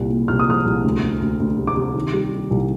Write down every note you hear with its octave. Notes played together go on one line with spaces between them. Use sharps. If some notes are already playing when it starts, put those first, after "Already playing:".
Already playing: C2 A#2
A#2
C2 F6
D#6
F3 F6
C2
D2
D2
D2
D2
C3
D6
C3
D#3
G3
D#3
C2